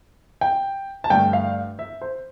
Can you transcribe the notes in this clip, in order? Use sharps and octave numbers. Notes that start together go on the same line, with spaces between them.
G5
A5
G2 D3 A3 G5
F5
E5
C5